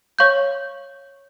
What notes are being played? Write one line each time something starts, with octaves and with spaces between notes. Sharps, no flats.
C#5 F5 C#6 G6